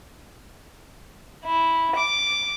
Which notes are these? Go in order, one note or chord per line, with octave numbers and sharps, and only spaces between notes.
E4
D6